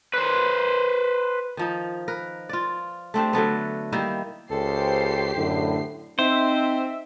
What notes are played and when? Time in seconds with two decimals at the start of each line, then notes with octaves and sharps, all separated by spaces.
0.14 B4 C5
1.57 D#3 F3 D#4
2.08 A#4 B4
2.49 F4 D5
3.14 A3 C4 D4 G4
3.33 D3 F#3 A3 B3
3.92 D#3 G3 A#3 E4
4.51 C#2 G4 A4 C5 C7
5.36 F#2 A2 D3
6.19 C4 D#4 C5 E5